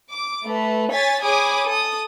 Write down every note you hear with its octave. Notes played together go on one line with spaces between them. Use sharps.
D6
A3 B4
C#5 G#5 A6 B6
G#4 C#5 G#5 B5 D6 D#6
A4 D#6